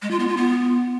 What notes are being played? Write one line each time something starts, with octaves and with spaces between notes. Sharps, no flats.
G#3
F4
B3
F4
B3